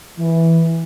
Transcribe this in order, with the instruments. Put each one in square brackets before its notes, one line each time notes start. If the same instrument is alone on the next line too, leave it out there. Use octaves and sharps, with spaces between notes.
[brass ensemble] E3